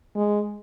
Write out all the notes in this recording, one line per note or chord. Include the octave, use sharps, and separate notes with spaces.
G#3